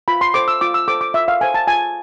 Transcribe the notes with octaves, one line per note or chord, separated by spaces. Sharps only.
F4 B5
C6
A4 C5 D6
E6
F4 D6
E6
A4 C5 D6
D6
F4 E5
F5
A4 C5 G#5
A5
F4 G#5